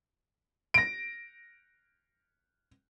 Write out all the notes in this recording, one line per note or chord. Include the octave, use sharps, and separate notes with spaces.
A#6 D7